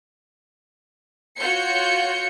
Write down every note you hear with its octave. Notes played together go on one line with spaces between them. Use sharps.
F4 F#4 C#5 G6 C#7